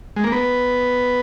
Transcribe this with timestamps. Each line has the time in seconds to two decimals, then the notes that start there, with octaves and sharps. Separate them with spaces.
0.16 G#3
0.24 A#3
0.32 B3